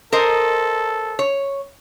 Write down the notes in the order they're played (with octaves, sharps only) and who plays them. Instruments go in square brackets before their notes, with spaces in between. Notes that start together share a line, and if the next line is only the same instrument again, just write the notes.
[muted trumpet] A4 [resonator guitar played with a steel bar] A#4 C5 D#5
[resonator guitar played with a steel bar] C#5